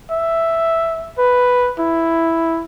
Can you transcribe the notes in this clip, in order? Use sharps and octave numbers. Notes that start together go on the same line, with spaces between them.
E5
B4
E4